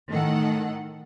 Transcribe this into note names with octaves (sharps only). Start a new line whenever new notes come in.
A2 D#3 A4 F#5